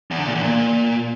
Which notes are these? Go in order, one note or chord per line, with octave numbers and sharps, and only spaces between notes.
E2
D3
A#2
E2
A#2